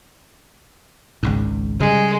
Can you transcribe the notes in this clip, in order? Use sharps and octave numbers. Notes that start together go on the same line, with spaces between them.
G#1 C#2 G#2
C#3 G3 G#3